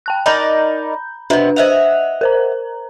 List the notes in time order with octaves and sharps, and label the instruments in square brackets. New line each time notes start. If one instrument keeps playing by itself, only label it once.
[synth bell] G5 A5 F#6
[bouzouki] D#4 A#4 D5 [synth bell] A#5 B5 G6
[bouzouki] C3 B3 [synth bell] D4 B4
[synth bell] C5 F#6 F7 [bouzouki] D#5 E5 F#5
[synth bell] A#4 C5 A#5